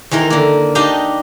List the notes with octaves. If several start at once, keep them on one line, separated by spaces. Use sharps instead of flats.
E2 D#3 E3 A#4
D3 A#3
D4 D#4 G4 D#5 F5 A5